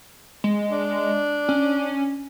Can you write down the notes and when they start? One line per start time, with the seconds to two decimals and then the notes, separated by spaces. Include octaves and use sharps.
0.44 G#3
0.70 D4
1.49 C#4